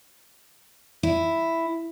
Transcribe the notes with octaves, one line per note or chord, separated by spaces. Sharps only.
E4